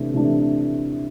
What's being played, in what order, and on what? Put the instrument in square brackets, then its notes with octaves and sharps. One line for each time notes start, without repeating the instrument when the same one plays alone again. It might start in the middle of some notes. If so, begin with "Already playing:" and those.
Already playing: [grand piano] C3 E3 A3 D4
C3 E3 A3 D4